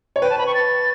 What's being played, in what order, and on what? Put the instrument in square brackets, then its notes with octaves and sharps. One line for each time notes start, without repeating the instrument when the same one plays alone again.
[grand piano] C#5
[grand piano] B4 [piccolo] G5
[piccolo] A5
B5
C#6
A6